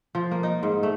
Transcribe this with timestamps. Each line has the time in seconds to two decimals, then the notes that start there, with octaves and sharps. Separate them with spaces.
0.15 F3
0.31 A#3
0.43 D#4
0.63 G#2
0.83 A3